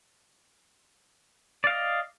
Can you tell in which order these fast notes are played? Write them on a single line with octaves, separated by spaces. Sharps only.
D5 F5 D#5